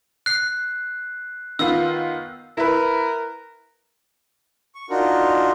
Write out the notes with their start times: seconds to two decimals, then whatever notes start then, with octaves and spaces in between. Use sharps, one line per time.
0.26 F#6 C7
1.59 D#3 B3 F4 E6
2.57 E4 A#4 B4
4.75 C#6
4.90 D4 D#4 F4 F#4 A#4